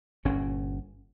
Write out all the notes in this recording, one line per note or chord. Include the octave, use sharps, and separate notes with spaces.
G1 A#2 C#4